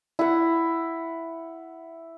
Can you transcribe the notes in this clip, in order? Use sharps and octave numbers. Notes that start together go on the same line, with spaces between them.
E4 F#5